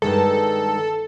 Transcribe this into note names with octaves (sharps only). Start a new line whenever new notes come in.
G2 D#3 G#3 A4